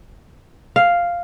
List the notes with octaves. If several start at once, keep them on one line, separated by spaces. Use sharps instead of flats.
F5